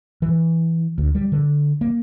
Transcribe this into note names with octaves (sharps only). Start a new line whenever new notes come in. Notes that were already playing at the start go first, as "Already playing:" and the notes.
E3
D2
G3
D3
A#3